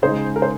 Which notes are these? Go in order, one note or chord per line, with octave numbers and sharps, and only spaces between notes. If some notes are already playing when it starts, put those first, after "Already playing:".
C#3 G#3 D#4 G#4 C5
A#4
C5